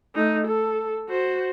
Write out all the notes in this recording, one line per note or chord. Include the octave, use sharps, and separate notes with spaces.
A3 D#4
A4
F#4 C5